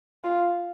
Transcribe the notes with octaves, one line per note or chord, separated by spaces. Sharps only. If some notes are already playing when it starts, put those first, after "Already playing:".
F4